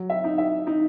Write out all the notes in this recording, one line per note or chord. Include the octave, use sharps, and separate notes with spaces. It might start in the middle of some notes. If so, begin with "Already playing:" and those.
Already playing: F#3
E5
D#4
E5
D#4